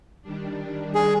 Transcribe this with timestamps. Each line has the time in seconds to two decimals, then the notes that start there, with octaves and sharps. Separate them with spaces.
0.22 D#3 G3 D4
0.95 G#4